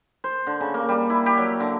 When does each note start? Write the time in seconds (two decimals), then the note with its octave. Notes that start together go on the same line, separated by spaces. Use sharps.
0.24 C5
0.47 D3
0.61 C#3
0.74 A#3
0.89 G3
1.10 E4
1.26 G4
1.38 F#3
1.60 D3